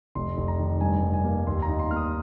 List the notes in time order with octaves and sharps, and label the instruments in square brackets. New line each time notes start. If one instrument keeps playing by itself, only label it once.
[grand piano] F1 C6
F1
A#5
D#3
G2 G#5
G2
G#5
A#3
D#2 C6
A#5
D#4
C6
A#3 F6
D#6